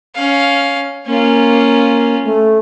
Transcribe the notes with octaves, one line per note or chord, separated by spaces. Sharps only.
C#4 F5
A#3 C#4 F4
A3